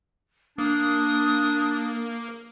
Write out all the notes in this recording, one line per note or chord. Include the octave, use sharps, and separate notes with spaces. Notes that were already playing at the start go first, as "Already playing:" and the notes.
A#3 D4 D#6